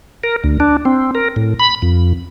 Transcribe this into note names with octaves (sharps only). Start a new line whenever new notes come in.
A#4
D2
D4
C4
A#4
A2
B5
F2